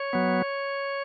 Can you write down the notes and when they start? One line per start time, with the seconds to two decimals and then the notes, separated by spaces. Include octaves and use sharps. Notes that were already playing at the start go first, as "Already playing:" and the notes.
Already playing: C#5
0.13 F#3 B3